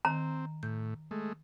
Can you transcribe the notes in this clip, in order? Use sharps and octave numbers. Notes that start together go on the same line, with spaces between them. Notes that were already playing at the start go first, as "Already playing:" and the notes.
D#3 C4 A#5
A2 G6
G#3 A3